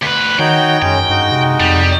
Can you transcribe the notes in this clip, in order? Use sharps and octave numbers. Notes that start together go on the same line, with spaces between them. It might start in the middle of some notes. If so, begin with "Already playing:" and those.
D2 B4
D#3 D#4 F#4 C#5 G5
F#2 G#3 C#4 G5
G2 G#3 D#4 F#4
C3
F2 G3